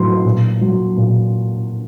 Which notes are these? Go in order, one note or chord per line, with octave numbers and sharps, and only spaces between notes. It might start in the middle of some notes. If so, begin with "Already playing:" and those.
Already playing: A2 F#3 C6
A#2
F#3
A#2